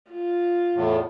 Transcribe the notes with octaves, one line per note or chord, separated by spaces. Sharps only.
F4
E2 A2